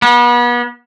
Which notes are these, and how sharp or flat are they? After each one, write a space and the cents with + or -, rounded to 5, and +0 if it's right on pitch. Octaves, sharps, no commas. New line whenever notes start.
B3 -35